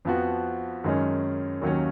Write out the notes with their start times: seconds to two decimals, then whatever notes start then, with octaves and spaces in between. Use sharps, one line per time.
0.05 F2 F3 B3 F#4
0.84 F#2 D#3 G#3 C#4
1.61 D#2 D#3 F#3 A#3 C#4